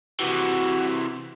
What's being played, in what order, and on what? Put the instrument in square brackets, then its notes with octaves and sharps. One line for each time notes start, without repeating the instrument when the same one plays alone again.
[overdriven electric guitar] C3 E3 [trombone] F#4